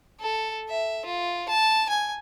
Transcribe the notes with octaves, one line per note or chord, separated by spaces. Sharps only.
A4
E5
F4
A5
G#5